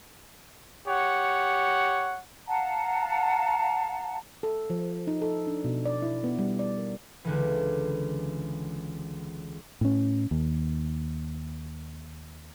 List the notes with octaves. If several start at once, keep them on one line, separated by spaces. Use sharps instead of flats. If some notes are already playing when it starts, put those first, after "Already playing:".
G4 C#5 F#5
F5 F#5 A5 A#5
A4
F3
D#4
A4
D4
B2
D5
E4
B3
G3
D5
A#4
C#2 D3 E3
A2 C#4
D#2